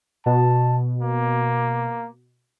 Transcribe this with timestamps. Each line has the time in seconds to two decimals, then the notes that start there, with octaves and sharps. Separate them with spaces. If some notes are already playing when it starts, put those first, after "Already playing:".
0.26 B2 A5
1.03 A#3